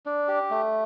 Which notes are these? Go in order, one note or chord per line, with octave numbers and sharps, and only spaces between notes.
D4
G4
A3